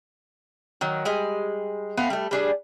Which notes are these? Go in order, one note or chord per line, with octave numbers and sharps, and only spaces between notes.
D#3 F#3
G3 G#3 G#5
A3 B3 C4 F5
G3 A3
G3 D4 G#4